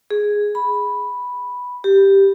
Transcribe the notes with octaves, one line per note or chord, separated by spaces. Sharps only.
G#4
B5
G4